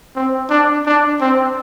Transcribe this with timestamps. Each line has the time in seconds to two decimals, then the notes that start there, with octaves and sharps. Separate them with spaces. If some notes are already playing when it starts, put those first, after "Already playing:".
0.16 C4
0.50 D4
0.86 D4
1.21 C4